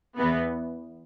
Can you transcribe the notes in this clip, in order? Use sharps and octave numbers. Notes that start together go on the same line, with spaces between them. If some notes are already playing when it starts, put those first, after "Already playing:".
E2 E3 B3